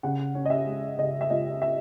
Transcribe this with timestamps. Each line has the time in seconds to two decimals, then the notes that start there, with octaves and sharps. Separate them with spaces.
0.03 C#3 F#5
0.35 C#4
0.45 D#5
0.50 E5
0.67 G#3
0.98 C#3 D#5
1.21 E5
1.30 C#2 D#5
1.62 E5